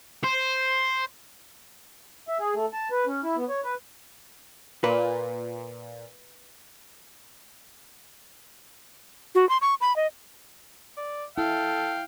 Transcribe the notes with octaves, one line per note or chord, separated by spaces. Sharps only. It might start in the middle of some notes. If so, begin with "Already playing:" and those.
C5
E5
G#4
A3
A5
B4
C#4
E4
B3
C#5
B4
A#2 B4
F#4
C6
C#6
B5
D#5
D5
E4 A4 F5 G5